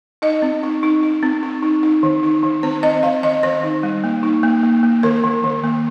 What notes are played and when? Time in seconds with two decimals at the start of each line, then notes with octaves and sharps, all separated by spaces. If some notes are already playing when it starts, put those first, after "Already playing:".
0.22 D#4 D#5
0.42 C4
0.63 D#4
0.83 D#4
1.03 D#4
1.23 C4
1.43 D#4
1.63 D#4
1.83 D#4
2.03 D#3
2.23 D#4
2.43 D#3
2.63 C4 C5
2.83 C4 D#5
3.03 D#3 F5
3.23 D#3 D#5
3.43 D#3 C5
3.63 D#4
3.83 G3
4.04 A#3
4.23 D#4
4.43 A#3
4.63 A#3
4.83 A#3
5.03 D#3 A#4
5.24 D#3
5.44 D#3
5.64 A#3